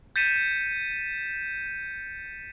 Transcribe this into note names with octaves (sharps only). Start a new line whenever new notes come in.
G6 A6 B6 C#7 D#7 E7